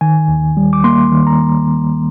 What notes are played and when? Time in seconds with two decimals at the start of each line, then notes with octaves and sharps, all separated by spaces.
0.01 D#3 G#5
0.28 D#2
0.57 G3
0.73 D6
0.84 A#3 C6
1.12 D#3
1.27 A#5